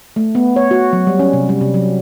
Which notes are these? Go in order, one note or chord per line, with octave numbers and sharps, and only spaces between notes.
A3
B3
C#5
F#4
F#3
G3
C#4
C3
G3
C3
F#3